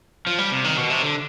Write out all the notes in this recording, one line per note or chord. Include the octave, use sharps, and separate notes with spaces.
F3
G3
C3
D#3
B2
C3
D3